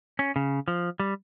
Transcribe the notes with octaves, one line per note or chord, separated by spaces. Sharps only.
C#4
C#3
F3
G3